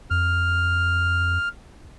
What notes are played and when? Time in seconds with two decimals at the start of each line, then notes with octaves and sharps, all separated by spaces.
0.10 F2 F6